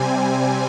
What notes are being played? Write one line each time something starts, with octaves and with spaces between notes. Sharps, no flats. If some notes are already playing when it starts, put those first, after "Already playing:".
Already playing: C3 G3 C4 G#5